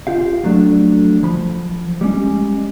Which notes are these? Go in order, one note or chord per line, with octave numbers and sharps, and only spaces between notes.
F4 G4 F5
F2 F#3 A3 D4
F3 B5
G3 G#3 C#4